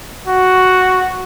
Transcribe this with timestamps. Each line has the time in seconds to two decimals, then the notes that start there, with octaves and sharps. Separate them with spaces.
0.28 F#4